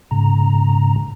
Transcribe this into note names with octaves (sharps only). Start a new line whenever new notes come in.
G#2 C#3 A#5